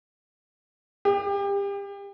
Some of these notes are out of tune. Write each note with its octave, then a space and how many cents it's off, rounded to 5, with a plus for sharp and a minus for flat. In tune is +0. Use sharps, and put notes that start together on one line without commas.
G4 +30